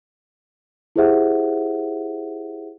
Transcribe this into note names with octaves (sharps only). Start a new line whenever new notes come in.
E4 G4 G#4 C5 E5 F#5